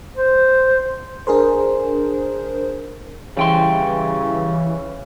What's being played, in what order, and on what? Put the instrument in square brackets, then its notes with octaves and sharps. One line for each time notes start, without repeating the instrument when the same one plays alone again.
[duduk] C5
[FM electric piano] D4 G#4 A#4 C5
[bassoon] C#3 [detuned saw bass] E3 [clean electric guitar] G3 G5 C6